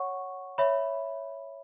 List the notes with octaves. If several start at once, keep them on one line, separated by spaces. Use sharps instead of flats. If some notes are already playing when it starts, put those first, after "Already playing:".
Already playing: C#5 F#5 C#6
C#5 E5 B5